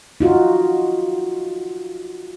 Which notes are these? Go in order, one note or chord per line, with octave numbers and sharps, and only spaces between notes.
D#4 F4 F#4